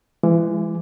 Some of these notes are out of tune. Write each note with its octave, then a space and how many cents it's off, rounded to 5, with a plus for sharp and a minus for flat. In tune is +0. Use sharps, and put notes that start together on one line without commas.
E3 +30 G#3 -15